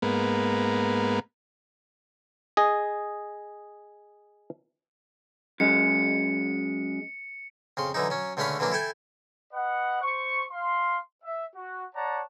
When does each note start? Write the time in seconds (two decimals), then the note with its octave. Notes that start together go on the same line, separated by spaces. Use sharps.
0.02 G#2 A#3 B3
2.57 G#4 D#5
5.60 F#2 G#3 C#7
7.77 F2 C#3 C6
7.94 D3 E3 F#3 D#4
8.10 F#3 C#4
8.37 C#2 D3 A3 C#4 F5 B5
8.59 D3 E3 F#3 A#3 D4
8.72 E4 A4 G5 G#5
9.53 B4 D#5 F#5
10.02 C5 C#6
10.51 F5 C6
11.24 E5
11.55 F#4
11.94 C#5 D5 F#5 A5 A#5